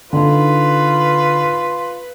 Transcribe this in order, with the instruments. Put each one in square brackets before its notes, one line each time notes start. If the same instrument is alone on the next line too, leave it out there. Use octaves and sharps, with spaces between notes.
[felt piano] D3 D#4 [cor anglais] F4 [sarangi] B4